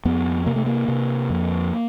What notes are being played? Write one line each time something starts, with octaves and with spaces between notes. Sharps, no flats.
F2 B3
C3 A#3
A3
A#3
C3
F2